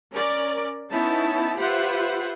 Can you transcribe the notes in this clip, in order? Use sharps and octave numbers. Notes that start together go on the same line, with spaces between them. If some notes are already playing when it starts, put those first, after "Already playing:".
C#4 A#4 D5
B3 C#4 D#4 E4 A5
F4 G4 B4 C5 E5 F#5